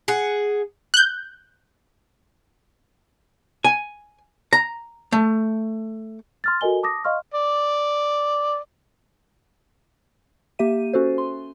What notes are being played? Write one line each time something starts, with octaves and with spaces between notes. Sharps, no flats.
G#4 F#5
F#6 G6
G#5
A#5
A3
C6 F6 A6
F#4 A4 A#4 D#5 G#5 G7
A5 D6 D#6 A#6
D#5 F5 C6 C#6 F6
D5
A#3 G4 E5 D#7
C#4 F#4 A4 C5
C6